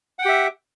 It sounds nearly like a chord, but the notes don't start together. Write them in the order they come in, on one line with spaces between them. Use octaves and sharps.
F#5 G5 G4 E5